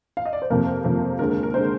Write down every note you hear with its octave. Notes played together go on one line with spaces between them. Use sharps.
F5
D#5
D5
C5
F2 C3 F3 A#3 A#4
F2 C3 F3 A#3
D#2 D3 G#3 A#4
A#4
A#4
D3 G#3 C5